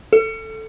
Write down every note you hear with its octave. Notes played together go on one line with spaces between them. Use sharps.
A4